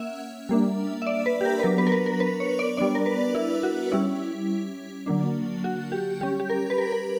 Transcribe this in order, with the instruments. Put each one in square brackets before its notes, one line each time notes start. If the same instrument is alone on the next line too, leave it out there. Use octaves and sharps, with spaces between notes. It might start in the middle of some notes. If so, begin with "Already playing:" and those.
Already playing: [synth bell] A#3 C#4 E5 F#5
G3 A#3 D4
E5
D5
B4
G4
A#4
B4
F#3 B3 D4 A#4
B4
A#4
B4
A#4
B4
C#5
D5
G3 B3 D4 D5
A#4
B4
E4
F#4
G3 C#4 E4
D3 F#3 A#3 D4
F#4
G4
G3 C#4 G4
G4
A#4
B4
A#4
A#4